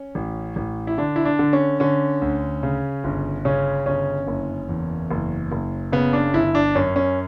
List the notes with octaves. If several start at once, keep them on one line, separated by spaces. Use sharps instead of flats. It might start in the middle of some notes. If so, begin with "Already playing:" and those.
Already playing: C#4
A1
A1
E4
D3 D4
E4
D4
D3
C#4
D3 C#4
D2
C#3
G1
C#3 C#4
G1 C#4
F#1
E2
F#1
F#1
C#3 B3
D4
G1 E4
D4
F#2 C#4
C#4